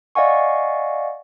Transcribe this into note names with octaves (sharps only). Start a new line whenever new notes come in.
D5 D#5 F5 F#5 G#5 C#6